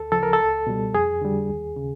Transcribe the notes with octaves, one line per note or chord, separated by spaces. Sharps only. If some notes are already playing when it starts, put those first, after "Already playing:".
Already playing: D2 A4
C#3 F3 A4
A#4
A4
C#2
B2 G3
F2 G#4
D3 G3
D#2
C#3